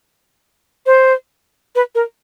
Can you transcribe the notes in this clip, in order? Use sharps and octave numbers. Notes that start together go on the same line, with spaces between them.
C5
B4
A#4